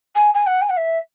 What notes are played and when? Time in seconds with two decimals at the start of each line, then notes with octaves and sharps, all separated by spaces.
0.15 G#5
0.34 G#5
0.46 F#5
0.61 G#5
0.69 F#5
0.76 E5